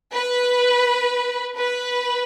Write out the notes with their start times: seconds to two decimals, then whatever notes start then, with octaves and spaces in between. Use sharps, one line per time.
0.13 B4
1.57 B4